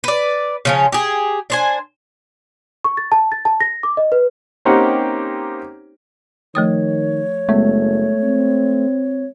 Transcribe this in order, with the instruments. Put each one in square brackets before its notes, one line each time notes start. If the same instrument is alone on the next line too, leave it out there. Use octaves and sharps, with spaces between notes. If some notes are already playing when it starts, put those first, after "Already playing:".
[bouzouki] B4 D5
C#3 F3 C#4
G4 G#4
D4 C5 G#5
[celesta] C#6
A6
A5
A6
A5
A#6
D6
D#5
B4
[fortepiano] A#3 C4 C#4 D#4 G4 F#5
[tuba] D#3 [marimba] F3 A3 D#6 [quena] C#5
[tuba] F#1 [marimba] G#3 B3 [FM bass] A3
[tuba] C4